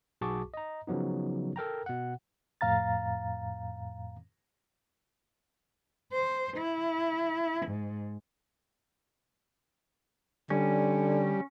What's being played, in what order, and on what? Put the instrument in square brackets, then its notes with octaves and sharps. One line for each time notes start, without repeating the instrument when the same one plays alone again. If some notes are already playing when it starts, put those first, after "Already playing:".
[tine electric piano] B1 F#4 G#4 A5 C#6 D6
D#5 A#5
C#3 F3 F#3 B3 D#4
A4 A#4 G5 A#5
B2 F#5
[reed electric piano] F2 A2 F5 A#5 A6
[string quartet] C5
E4
G#2
[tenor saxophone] D3 [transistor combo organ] G3 [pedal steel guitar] C#4